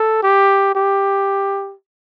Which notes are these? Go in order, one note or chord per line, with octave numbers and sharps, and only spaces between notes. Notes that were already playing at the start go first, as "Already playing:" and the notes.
Already playing: A4
G4
G4